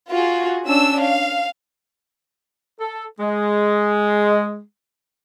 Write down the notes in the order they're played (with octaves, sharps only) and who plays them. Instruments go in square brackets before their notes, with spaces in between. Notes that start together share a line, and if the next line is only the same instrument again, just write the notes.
[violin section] F4 F#4 G#4
C#4 D4 E6
F5
[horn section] A4
G#3